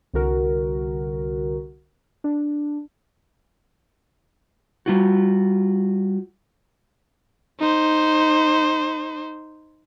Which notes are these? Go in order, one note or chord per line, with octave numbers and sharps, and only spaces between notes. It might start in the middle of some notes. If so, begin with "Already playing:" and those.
C2 D3 F#4 A#4
D4
G3 F4 F#4
D#4 C5